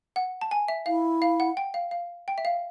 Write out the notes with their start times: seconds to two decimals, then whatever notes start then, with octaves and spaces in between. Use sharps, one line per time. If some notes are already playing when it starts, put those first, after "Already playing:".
0.16 F#5
0.41 A5
0.51 G#5
0.68 E5
0.86 E4 F5
1.22 F5
1.40 F#5
1.57 G5
1.74 F5
1.91 F5
2.28 G5
2.38 E5
2.45 F5